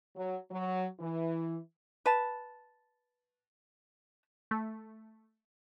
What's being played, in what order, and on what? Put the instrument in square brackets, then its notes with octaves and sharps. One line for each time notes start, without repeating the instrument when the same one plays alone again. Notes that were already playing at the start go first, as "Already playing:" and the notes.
[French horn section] F#3
F#3
E3
[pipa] B4 A5
[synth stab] A3